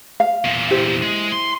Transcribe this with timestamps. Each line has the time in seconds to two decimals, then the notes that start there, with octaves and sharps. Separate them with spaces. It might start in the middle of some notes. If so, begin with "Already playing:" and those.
0.20 F5
0.45 E2 A#2
0.71 E4 G4 C5
1.02 G#3
1.32 C6